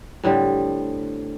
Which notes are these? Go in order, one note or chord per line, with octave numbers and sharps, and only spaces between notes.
A2 D3 G3 C4